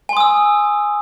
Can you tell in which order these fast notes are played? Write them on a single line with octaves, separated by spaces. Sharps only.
G#5 C6 D#6 E6